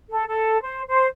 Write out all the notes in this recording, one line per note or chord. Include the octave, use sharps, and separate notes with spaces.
A4
A4
C5
C5